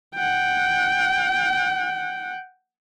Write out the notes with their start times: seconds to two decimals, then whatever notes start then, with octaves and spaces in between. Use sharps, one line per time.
0.15 F#5 G5